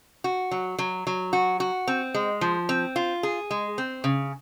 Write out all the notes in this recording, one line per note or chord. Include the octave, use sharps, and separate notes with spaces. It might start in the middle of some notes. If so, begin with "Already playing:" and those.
F#4
F#3
F#3
F#3
F#4
F#4
C4
G#3
F3
C4
F4
G#4
G#3
C4
C#3